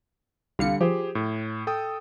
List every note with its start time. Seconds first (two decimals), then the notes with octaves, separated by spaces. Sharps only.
0.59 C2 D3 G3 F5 C#7
0.81 F3 G4 G#4 C5
1.15 A2
1.67 A4 G5 D#6